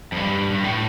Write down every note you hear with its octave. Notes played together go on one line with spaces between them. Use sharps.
F2
G2
G2
A2